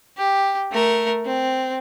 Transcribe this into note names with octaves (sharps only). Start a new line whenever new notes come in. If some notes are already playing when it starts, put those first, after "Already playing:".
G4
A3 A#4
C4